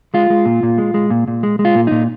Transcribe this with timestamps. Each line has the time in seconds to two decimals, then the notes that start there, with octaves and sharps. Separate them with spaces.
0.14 G#3 F4
0.30 G#3
0.46 A#2
0.63 A#2
0.78 G#3
0.94 G#3
1.10 A#2
1.28 A#2
1.43 G#3
1.59 G#3
1.65 F4
1.75 A#2
1.87 A#2 D#4